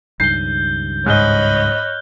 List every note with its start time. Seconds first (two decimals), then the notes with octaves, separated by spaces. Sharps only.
0.20 C#2 G2 D#3 G6 C7 G7
1.06 G#2 C#5 D#5 B5 F6 F#6 G7